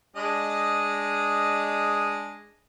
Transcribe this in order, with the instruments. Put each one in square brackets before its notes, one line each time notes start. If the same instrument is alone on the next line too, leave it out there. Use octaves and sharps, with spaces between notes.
[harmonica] G#3 D4 D#5